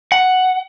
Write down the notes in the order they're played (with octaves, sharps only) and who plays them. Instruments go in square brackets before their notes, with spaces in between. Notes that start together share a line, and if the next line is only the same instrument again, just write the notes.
[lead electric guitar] F#5